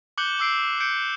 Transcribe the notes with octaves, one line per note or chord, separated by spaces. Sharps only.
D6 F#6 G6 C#7 F#7 G7
D6 E6 C7 D7
G6 C#7 D7